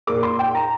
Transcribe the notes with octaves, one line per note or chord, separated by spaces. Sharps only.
A#2 A#3 D6
C6
G5
A#5